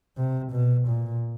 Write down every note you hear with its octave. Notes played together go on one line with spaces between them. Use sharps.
C3
B2
A#2